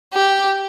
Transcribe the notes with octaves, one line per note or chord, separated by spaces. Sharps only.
G4